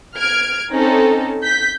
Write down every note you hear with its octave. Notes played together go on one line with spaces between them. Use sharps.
F6 G#6 D7
C4 C#4 D#4 A4
G6 B6